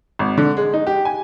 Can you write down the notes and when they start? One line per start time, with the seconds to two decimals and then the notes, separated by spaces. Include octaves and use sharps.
0.19 G#1
0.37 D3
0.57 G#3
0.74 D#4
0.87 G4
1.05 G#5